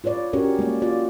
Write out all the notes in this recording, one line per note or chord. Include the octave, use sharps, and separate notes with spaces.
F4 B4 C#5 D5
C#4 F#4 G4 A#4 C#5
G#3 A#3 D5
F4 F#4 D5